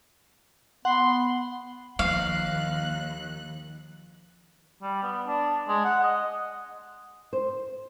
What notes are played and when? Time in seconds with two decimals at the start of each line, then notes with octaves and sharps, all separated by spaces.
0.85 B3 F#5 C6
1.99 D#2 F3 F5 F#6
4.82 G3
5.03 B3
5.27 D4
5.68 G#3
5.84 F#5
6.03 D#5
7.33 C5